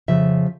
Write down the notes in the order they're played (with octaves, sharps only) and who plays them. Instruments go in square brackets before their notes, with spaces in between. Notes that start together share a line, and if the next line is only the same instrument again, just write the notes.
[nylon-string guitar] F2 C#3 F3 E5